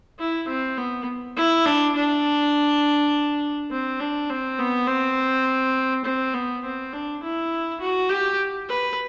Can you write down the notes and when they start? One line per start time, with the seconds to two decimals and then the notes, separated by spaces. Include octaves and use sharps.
0.19 E4
0.48 C4
0.78 B3
1.37 E4
1.65 D4
1.95 D4
3.71 C4
4.00 D4
4.30 C4
4.59 B3
4.87 C4
6.04 C4
6.34 B3
6.64 C4
6.93 D4
7.23 E4
7.80 F#4
8.09 G4
8.68 B4